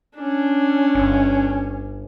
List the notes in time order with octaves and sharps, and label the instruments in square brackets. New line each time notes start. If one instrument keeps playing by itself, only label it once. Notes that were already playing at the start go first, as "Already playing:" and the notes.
[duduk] C#4 [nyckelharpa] D4
[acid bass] G1